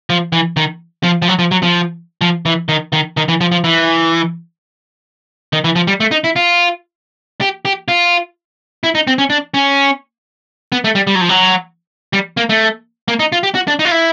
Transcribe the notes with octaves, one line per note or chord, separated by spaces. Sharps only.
F3
E3
D#3
F3
F3
F#3
F3
F#3
F3
F3
E3
D#3
D#3
D#3
E3
F3
F3
E3
D#3
E3
F3
G3
A3
D#4
E4
F4
G4
G4
F4
E4
D#4
C4
C#4
D4
C#4
B3
A3
G3
G3
F#3
F3
F#3
G3
A#3
A3
A#3
D#4
F4
G4
F#4
D4
D#4
F4
E4